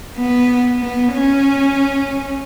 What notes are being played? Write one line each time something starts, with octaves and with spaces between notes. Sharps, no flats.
B3
B3
C#4